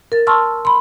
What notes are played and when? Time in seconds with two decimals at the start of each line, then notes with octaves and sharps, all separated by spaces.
0.12 A#4 A6
0.27 A5 C6 C#6 E6 F6
0.65 B5 C6